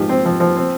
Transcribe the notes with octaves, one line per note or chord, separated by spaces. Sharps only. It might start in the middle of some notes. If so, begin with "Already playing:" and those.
Already playing: G#2 F3 F4 G4
C4
F3
F3
C4